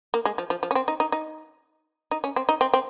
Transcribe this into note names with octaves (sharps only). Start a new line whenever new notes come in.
A#3
G#3
F3
F3
F3
C#4
C4
D#4
D#4
D#4
D#4
C#4
C4
D#4
C4
C4